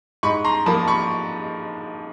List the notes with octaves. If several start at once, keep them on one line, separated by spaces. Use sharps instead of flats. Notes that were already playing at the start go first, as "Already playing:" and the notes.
G#2 B5 C#6
A#5 C6
F3 A#3 A5 B5
B5 C#6